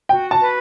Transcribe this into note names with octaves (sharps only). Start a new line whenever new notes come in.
F#4 G5
A5
B4